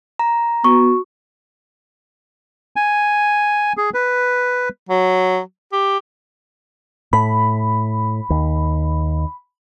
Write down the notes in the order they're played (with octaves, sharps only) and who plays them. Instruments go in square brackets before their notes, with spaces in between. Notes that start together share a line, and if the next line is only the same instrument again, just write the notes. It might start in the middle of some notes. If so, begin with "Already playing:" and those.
[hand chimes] A#5
[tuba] B3 [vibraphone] F#4 [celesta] C#6
[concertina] G#5
G#4
B4
[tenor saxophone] F#3
G4
[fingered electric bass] A2 [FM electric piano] B5
[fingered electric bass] D#2